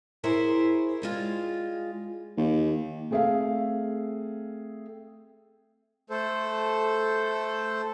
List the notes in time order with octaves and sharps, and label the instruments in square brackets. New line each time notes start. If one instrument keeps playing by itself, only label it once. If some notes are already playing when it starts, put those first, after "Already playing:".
[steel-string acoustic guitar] E4 G#4 A#4 C5 C#5 E5
G3 G#3 F4
[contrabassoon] D#2
[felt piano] A3 C4 G#4 A4 E5 F5
[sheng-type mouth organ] A3 A4 C5